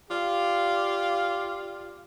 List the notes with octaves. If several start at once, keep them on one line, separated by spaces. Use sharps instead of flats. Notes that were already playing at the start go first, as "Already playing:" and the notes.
F4 G4 D5 F5